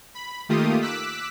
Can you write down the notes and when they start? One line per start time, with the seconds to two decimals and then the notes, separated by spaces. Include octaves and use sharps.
0.15 B5
0.49 D#3 A3 A#3 F4 G4 D#6
0.81 D6 E6 F#6 B6